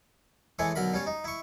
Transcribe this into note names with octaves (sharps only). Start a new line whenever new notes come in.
E3 G#3 A3 C#5
B1 D3 A#4 B5
G3 C#4 C#5
D#4
E4 C#6